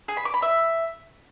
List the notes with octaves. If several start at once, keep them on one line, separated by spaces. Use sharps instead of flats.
G#4
B5
D6
B5
E5